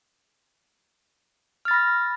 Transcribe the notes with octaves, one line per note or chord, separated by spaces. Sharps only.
B5 F6 A6 A#6